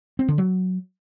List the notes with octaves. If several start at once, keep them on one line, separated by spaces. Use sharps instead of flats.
C4
D3
F#3